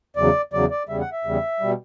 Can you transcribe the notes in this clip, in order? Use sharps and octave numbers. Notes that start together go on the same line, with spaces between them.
E2 C#3 F#3 D5
E2 C#3 F#3 D5
D5
E2 C#3 G3 E5
F#5
E5
E2 C#3 G3
B2 G3